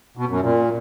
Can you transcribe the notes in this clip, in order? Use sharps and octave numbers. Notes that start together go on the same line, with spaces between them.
B2
F#2
A#2